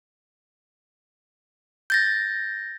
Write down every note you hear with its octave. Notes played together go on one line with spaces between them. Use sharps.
G6 A6 A#6